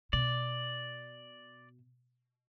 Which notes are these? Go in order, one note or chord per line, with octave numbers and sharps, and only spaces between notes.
B2 D5